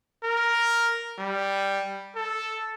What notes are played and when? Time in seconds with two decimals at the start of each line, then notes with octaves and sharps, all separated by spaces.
0.24 A#4
1.19 G3
2.16 A4